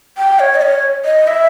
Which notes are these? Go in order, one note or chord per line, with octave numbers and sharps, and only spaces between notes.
G5
C#5
D#5
C#5
D#5
E5